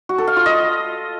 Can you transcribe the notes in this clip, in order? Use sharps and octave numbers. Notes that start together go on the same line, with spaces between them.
F#4
A4
F5
F4
D#5